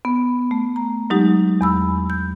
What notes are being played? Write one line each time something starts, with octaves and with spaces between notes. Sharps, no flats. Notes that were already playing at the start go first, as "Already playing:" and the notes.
B3
A3
A#5
F#3 G#3 D#4 G4
E2 B5 E6
G6